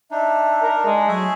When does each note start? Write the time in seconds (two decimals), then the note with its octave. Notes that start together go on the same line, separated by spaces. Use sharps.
0.11 D4 D#4 E5
0.63 A#4
0.86 G#3
1.08 F#3 A3 G#4 E5